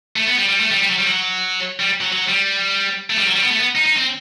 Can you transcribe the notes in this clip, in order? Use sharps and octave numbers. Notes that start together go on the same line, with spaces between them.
A3
B3
G3
G3
A3
G3
G3
F#3
G3
F#3
G3
F#3
F#3
G3
A3
G3
F#3
G3
B3
A3
B3
D#4
D#4
C4